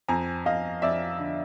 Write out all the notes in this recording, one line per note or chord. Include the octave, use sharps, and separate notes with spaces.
F2 G#5 A#5
F2 D#5 F5
F2 D5 E5
D3